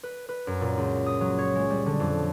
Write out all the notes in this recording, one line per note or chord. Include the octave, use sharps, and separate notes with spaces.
B4
B4
F#2
A#2
C#2
D#6
F#3
C#5
G#3
G3
D3
F2